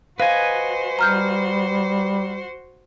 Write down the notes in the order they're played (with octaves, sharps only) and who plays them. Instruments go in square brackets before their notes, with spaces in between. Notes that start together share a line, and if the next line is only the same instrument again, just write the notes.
[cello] F#4 C5 [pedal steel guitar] B4 D#5 G#5 [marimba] F5
[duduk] G3 [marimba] A#5 F6 G6